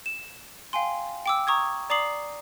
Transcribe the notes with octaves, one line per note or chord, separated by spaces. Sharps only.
E7
F5 G5 G#5 C6
G5 D6 E6
A#5 C#6 D#6 G#6
D5 A#5 D6 D#6 C7 F#7